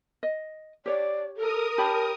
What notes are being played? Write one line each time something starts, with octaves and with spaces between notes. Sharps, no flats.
D#5
G4 C#5 D5
A4 A#4 D#6
G4 C#5 A5 B5